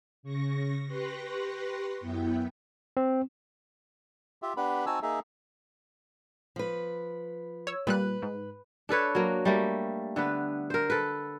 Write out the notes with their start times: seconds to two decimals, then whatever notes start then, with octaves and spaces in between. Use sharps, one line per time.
0.23 C#3 C#6 A#6
0.87 G4 B4 C6 C#6 F#6 A#6
2.00 F#2 B3 E4 G5
2.97 C4
4.42 F4 G4 E5
4.57 B3 D4 G4 B4 B5
4.86 C4 D#4 F#4 G#5 A5 E6
5.02 A#3 D#4 G#4 E5
6.56 F3 B4
7.67 C#5 E6
7.87 A#2 G3 B4 F#6
8.22 G#2
8.89 D4 A4 B4 C#5
9.15 F#3 A#3
9.45 G3 A3 A#3
10.16 D3 B3 B4
10.70 A#4 C5
10.90 A4 B4